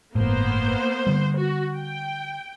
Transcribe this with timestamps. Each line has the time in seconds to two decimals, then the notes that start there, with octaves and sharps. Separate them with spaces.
0.15 G1 A2 A#3 B3 C5
1.07 D3 G3
1.38 F#4
1.76 G5